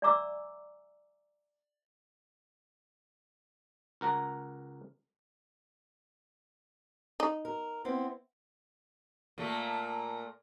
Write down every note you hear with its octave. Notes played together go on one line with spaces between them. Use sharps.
D5 E5 G#5 A#5 D6 E6
C#2 A#4 F#5 A#5
D#4
A#4
B3 C4 E4
A#2 A3 A#3